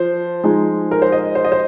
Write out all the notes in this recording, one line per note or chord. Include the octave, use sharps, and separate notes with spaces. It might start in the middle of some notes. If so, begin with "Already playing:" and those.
Already playing: F3 C5
F3 G#3 D#4 G#4
A#4
C5
D#5
C5
D#5
C5